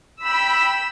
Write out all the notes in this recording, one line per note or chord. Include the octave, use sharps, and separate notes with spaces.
G5 B5 E6